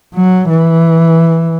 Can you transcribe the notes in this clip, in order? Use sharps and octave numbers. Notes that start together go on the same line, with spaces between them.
F#3
E3